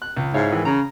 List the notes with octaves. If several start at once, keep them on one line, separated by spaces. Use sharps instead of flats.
F#6
C#2
G#2 E4 C#5 F5
D#3 E3
C#3 A#5